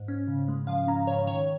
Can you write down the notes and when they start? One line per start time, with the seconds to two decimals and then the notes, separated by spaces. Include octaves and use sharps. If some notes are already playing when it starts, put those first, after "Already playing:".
Already playing: G#2
0.08 C#4
0.28 C#3
0.48 G#3
0.67 F3 F5
0.87 C#4 A#5
1.07 C#3 C#5
1.27 D#3 C#5